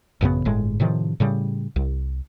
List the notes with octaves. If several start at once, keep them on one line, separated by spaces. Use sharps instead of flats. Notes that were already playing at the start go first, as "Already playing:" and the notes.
A1 F#2 C#3 B3
G1 A2 G#3
A2 C3 D#3 F3
A2 C#3 G3
C2